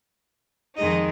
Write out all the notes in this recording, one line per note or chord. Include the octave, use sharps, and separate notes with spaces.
F2 D#3 G#3 D#4 D#5